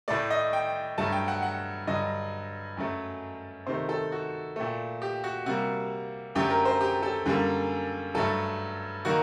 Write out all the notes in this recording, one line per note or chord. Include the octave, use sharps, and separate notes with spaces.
A2 A3 D5
D#5
G5
G2 F#3 A3 A5
G5
F#5
F#5
G2 D3 F#3 D#5
F#2 F#3 A3
C3 D#3 A3 C5
A4
F#4
A#2 A3
G4
F#4
C3 G3 A#3 F#4
F#2 D3 F#3 A3 G4
A#4
C5
G4
A4
F#2 D3 G3 A#3
G2 F#3 A3 A4
D#3 F#3 A#3 F#4